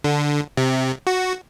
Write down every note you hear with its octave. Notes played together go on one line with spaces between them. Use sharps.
D3
C3
F#4